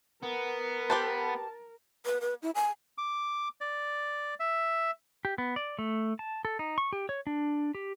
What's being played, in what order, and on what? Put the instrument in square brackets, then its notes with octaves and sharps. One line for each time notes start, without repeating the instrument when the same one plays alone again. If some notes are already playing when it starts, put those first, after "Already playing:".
[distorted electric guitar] B3 [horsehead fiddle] A#4
[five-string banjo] G4 B4 C5 [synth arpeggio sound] A5
[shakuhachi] B4
B4
E4
G#5
[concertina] D6
D5
E5
[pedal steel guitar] G4
B3
D5
A3
A5
A4
D#4
C#6
G4
C#5
D4
G4